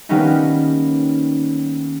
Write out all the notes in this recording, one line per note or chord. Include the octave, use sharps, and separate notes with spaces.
D#3 G3 A#3 B3 C#4 D#4